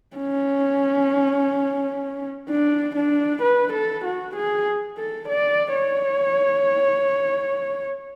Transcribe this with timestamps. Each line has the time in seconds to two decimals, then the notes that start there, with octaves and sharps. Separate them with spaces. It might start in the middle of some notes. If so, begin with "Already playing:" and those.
0.17 C#4
2.49 D4
2.96 D4
3.42 B4
3.73 A4
4.05 F#4
4.36 G#4
4.98 A4
5.29 D5
5.75 C#5